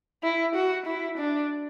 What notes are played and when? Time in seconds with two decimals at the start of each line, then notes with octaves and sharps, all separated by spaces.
0.23 E4
0.55 F#4
0.86 E4
1.18 D4